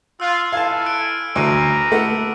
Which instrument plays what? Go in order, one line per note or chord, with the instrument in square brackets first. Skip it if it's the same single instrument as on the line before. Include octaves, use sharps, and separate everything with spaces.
[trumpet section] F4 [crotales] E6 F#6
[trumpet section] E4 A4 G#5 [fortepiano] F5 A5
[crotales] F6 F#6 D7
[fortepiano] D2 [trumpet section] B4 A#5 [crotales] D6 D#7
[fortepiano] A3 F#5